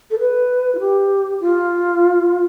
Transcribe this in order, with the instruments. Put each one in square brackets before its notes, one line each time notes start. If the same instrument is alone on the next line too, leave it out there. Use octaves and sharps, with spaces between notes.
[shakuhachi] A4
B4
F4
G4
F4